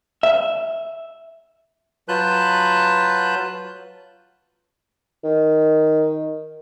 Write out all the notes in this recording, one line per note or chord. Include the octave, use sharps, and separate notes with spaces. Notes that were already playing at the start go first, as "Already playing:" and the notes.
E5
F#3 F4 B4 A5 F#6 G6
D#3